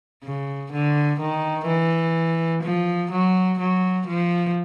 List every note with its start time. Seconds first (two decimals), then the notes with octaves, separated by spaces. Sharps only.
0.24 C#3
0.72 D3
1.20 D#3
1.68 E3
2.63 F3
3.11 F#3
3.59 F#3
4.07 F3